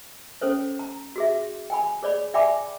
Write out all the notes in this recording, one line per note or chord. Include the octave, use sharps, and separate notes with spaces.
C#4 A4 C5 C#5
A#5
F#4 G#4 E5
G5 G#5 B5
G#4 C#5 D5 B5
D5 E5 G5 G#5 B5 D6